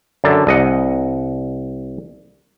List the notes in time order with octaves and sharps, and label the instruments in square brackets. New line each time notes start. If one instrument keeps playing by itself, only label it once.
[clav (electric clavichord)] F#2 D3 A5
C2 D#5 F#5